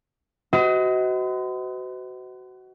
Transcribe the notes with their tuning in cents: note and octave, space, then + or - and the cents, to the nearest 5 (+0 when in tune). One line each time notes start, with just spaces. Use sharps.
F#4 +20 C5 -45 D#5 +30